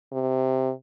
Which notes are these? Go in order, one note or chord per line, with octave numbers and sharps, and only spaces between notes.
C3